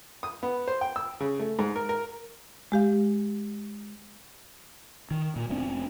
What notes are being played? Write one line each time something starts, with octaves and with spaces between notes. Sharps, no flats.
D#6
B3
C5
G5
E6
C#3
A3
G#2
A#4
A#4
G#3 G4 F5
D#3
A#2
F1 B3 C4 D4